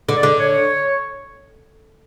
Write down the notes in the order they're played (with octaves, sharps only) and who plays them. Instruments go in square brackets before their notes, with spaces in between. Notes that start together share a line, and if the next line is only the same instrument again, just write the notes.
[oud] D3
[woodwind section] D5
[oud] D3
[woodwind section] C#5